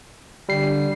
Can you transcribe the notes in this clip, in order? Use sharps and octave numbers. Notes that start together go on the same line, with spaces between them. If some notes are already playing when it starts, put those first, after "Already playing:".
D3 G3 C7